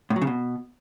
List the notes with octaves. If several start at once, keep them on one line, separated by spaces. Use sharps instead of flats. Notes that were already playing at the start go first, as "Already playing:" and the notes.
A2
F#3
C#3
B2